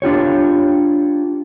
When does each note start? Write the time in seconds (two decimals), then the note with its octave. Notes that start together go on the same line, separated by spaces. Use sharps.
0.02 D4 F4 G4 C#5